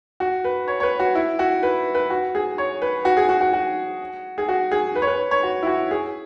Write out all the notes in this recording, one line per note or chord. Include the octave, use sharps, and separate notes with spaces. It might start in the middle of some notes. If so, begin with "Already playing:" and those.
F#4
B4
C#5
C#5
B4
F#4
E4
F#4
B4
B4
F#4
G#4
C#5
B4
F#4
G#4
F#4
F#4
F#4
G#4
F#4
G#4
B4
C#5
B4
C#5
F#4
E4
F#4
G#4